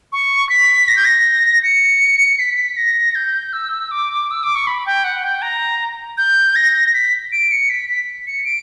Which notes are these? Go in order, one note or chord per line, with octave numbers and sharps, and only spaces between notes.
C#6
B6
A#6
G6
A#6
C#7
B6
A#6
G6
E6
D6
E6
D6
C#6
B5
G5
F#5
G5
A#5
G6
A#6
B6
D7
C#7
B6
B6
C#7
D7